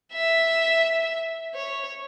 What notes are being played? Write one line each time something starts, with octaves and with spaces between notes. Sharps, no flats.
E5
C#5